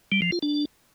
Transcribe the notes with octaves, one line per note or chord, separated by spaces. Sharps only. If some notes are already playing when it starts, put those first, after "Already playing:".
G3
F3
F4
D4